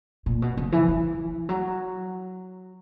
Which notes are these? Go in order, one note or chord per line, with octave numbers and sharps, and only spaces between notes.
A#2
B2
C#3
E3
E3
F#3